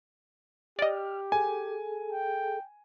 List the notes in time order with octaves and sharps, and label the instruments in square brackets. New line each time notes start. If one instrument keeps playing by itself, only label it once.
[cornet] G4 [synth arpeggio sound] D5 D#5 [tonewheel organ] F6
[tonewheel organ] G#4 A4 [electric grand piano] G#5
[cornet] G5